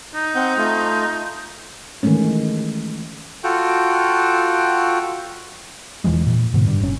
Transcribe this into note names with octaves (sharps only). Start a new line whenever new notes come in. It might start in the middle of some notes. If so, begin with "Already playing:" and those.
D#4
C4 F#5 G6
A3 F4
D#3 E3 G#3 A3 C#4
F4 F#4 A4 G5
E1 E3 F3 G#3
A#2
G#2 B2 D3
G2
F#1 C#4